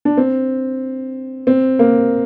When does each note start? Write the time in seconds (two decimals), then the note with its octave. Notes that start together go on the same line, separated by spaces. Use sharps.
0.05 D4
0.17 C4
1.47 C4
1.79 A#3